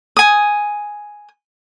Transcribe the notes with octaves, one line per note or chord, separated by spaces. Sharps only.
G#5 D#6